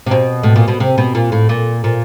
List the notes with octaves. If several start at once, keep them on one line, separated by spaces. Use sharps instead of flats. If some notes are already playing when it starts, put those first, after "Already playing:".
C3
B2
A2
A#2
B2
C3
B2
A#2
A2
A#2
A#2